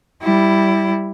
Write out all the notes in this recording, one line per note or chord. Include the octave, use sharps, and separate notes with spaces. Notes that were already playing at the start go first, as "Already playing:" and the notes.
G3 E4